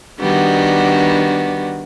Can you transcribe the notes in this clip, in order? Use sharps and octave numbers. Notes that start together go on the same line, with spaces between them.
D#3 G3 B3 D4 F#4